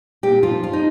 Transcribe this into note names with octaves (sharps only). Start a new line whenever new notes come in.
A#2 G4
F3 F4
F3 F4
D#4